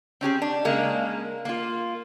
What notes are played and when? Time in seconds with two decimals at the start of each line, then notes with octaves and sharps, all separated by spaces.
0.21 C4 C#4 G4 G#4
0.42 D4
0.65 C#3 G#3 A#3
1.45 A#3 F4